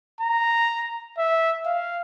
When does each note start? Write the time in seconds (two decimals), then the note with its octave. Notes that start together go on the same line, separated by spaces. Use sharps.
0.21 A#5
1.18 E5
1.66 F5